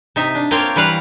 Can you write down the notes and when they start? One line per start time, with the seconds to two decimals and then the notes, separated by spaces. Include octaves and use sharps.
0.16 C3 D#4 E5
0.35 D4
0.51 A#3 C4 F4 C#5 F5 G5
0.76 E3 G3 B4 F5 F#5